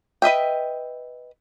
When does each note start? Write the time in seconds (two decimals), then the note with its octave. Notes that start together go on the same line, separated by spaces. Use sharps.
0.22 B4 D#5 E5 G5